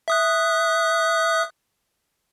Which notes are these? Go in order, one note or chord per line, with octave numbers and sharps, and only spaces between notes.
E5 D#6 F#6